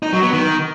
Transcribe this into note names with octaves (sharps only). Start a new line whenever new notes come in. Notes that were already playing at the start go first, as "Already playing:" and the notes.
D#4
F#3
B3
D#3